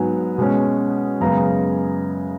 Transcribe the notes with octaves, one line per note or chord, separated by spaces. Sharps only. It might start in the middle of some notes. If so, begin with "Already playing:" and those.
Already playing: G#2 F#3 B3 F#5 G#5
B2 G#3 C#4
F#2 C#3 G#3 B3 A#5